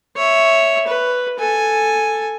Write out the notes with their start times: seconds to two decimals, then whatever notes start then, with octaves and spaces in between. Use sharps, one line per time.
0.17 C#5 E5
0.88 B4
1.39 A4 G#5